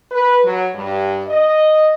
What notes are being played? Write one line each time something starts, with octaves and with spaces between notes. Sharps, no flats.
B4
F#3
G2
D#5